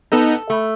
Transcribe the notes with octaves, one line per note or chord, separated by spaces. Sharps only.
B3 D#4 A4
A3